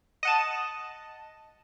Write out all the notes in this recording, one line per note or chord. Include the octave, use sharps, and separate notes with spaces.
D#5 F#5 A5